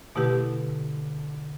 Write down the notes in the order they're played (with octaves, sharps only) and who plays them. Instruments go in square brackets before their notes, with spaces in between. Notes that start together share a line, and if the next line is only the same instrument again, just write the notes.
[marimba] B2 A3 E4 G4 B4 [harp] D3